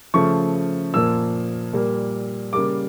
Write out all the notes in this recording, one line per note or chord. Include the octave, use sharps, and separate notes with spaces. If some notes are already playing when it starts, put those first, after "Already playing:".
C#3 F3 A3 C#6
A#2 F3 A#3 E6
A#2 G3 A#3
C#3 G3 A#3 D6